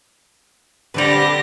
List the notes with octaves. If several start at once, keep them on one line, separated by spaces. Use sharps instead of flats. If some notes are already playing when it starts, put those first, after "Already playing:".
D3 G3 C4 G4 B4 A#6